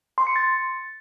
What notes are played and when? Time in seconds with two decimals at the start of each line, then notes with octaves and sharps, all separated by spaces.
0.18 C6
0.27 C#7
0.36 A6